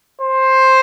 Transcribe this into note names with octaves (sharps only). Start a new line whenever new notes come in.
C5